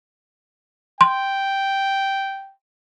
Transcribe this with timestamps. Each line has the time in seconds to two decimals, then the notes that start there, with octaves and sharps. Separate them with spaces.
1.01 G5 C6